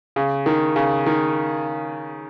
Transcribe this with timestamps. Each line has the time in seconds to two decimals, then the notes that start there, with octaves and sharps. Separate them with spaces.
0.16 C#3
0.46 D#3
0.76 C#3
1.06 D#3